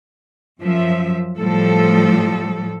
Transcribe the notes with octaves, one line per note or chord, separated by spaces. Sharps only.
F#2 F3 E5
A2 F3 G3 A4